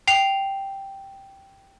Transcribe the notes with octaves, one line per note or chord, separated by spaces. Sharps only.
G5 C7 F7